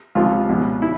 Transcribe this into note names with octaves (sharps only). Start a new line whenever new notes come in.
C#2 C3 F3 F4
C#2 B2
E4